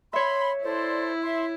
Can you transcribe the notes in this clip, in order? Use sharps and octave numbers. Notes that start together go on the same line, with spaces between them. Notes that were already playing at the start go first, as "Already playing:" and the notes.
C#5 E5 B5 C6
E4 A4 C5 D5
E5 C6